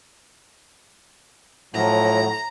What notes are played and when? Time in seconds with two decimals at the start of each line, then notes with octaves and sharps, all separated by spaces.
1.74 A2 F3 F#3 A#5